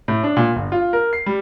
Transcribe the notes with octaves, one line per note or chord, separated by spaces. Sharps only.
A2
D4
A#2
G1
F4
A#4
C7
G3